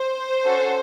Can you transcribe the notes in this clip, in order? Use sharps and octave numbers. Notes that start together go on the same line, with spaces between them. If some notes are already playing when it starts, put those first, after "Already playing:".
Already playing: C5
C#4 F#4 A4